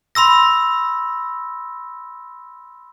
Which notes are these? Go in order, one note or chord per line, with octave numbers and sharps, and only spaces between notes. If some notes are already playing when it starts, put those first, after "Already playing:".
B5 C6 E6 A#6